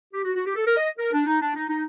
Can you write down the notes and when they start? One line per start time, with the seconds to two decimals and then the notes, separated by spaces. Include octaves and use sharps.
0.13 G4
0.24 F#4
0.35 F#4
0.46 G4
0.56 A4
0.67 A#4
0.77 D#5
0.98 A#4
1.13 D4
1.26 D#4
1.41 D4
1.55 D#4
1.68 D#4